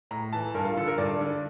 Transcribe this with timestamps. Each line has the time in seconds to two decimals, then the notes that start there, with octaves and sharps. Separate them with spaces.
0.11 A2 A#5
0.33 E3 A5
0.54 G2 A#4
0.65 F4
0.77 D3 A4
0.88 A#4
0.98 G2 D5
1.21 D3